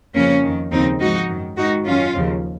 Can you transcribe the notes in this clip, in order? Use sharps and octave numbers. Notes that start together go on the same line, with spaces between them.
F2 C#3 F3 A#3 C#4
F2 D#3
D#2 C#3 F3 C4 D#4
G#2 F3 D#4 F#4
F#2 D#3
G#2 D#3 D#4 F#4
F#2 D#3 C#4 F4
D#2 C#3 F3